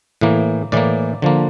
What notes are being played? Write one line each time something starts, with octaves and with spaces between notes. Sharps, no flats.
A2 E3 A#3
A2 E3 A#3 D5
D3 F3 A#3